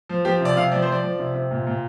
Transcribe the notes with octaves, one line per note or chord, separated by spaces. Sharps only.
F3
F3 G4
C3 D5
C3 F5
F3 D5
C5
F3 D5
F3
C3
C3
A#2
A#2